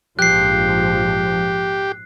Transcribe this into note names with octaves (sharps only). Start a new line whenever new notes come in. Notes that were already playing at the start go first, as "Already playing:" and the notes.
A#1 G#2 F3 G4 F#6 C7